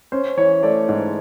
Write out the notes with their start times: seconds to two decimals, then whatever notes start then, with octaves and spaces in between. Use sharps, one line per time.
0.12 C#4 C5
0.37 E3 C#5
0.63 A3 D5
0.89 G#2